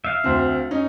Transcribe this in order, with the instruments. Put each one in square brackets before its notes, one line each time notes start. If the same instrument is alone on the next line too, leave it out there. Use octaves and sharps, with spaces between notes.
[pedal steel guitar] E5 F5
[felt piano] D2 C4
C#4 D#4